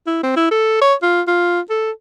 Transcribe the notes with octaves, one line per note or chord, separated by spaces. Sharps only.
E4
C4
E4
A4
C#5
F4
F4
A4